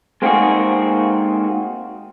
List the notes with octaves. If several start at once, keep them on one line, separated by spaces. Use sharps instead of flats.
G#3 A#3 C4 D#4 F#4 G#4